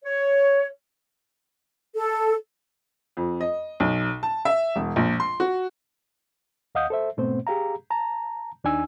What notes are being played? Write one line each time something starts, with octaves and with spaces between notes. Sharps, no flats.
C#5
A4
F2
D#5
B1
A5
E5
E1
A#1
C6
F#4
D#2 D#5 F5 F#5 D#6 G6
A4 C5 E5
G#2 B2 A3 B3 C4 C5
G4 G#4 F5 A#5
A5 A#5
D#2 D4 D#4 G#5 E6